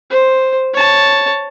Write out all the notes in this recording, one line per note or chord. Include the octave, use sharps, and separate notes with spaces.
C5
C#5 A5